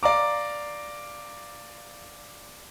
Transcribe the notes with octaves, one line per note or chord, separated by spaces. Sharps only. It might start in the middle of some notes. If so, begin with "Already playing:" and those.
D5 F5 A#5 D6